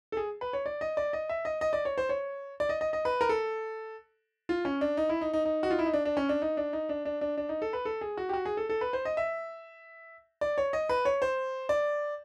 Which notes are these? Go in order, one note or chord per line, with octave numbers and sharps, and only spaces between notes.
A4
G#4
B4
C#5
D5
D#5
D5
D#5
E5
D#5
D#5
D5
C#5
C5
C#5
D5
D#5
D#5
D#5
B4
A#4
A4
F4
C#4
D4
D#4
E4
D#4
D#4
D#4
F#4
F4
E4
D#4
D4
D4
C#4
D4
D#4
D4
D#4
D4
D4
D4
D4
D#4
A4
B4
A4
G#4
F#4
G4
F#4
G#4
A4
A4
B4
C5
D#5
E5
D5
C#5
D#5
B4
C#5
C5
D5